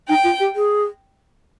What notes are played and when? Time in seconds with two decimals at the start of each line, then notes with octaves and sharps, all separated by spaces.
0.09 D#4 G5
0.24 F4
0.40 G4
0.55 G#4